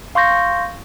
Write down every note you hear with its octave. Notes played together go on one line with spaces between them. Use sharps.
F5 C6 C#6 G6 A#6